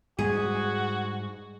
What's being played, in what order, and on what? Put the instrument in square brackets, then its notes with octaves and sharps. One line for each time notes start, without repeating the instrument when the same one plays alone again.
[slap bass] G#2 G3 [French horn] F#4 [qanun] G#4